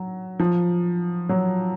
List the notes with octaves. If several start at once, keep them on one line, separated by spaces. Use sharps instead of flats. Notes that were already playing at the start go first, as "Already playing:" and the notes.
Already playing: F#3
F3
F#3